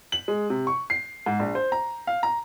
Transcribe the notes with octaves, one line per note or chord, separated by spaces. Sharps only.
F#7
G#3
C3
C#6
C7
G#2
A#1
C5
A#5
F5
A#5